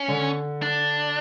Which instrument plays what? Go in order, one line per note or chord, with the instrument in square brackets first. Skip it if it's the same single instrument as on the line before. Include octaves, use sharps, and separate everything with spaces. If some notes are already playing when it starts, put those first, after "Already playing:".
Already playing: [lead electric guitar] C#4
[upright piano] D3
[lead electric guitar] D4